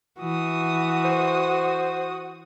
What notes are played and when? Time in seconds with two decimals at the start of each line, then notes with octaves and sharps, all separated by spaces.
0.20 E3 F#4 D#6
1.05 C5